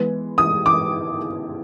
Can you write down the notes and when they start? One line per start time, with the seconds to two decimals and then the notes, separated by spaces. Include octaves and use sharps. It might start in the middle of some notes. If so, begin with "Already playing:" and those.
Already playing: E3 G#3 B3
0.38 D#6
0.66 D6